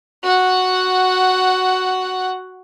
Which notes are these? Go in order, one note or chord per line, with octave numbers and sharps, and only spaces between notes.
F#4 F#5